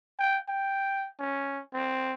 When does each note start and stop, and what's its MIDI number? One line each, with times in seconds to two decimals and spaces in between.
0.19 0.37 79
0.48 1.08 79
1.20 1.61 61
1.74 2.14 60